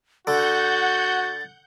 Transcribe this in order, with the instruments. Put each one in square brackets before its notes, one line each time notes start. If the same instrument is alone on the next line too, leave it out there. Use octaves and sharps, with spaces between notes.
[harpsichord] D3 [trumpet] F#4 [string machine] F#5 G6 [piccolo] A6